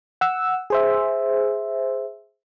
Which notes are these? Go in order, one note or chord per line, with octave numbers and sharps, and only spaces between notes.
F#5 E6
G#4 C5 E5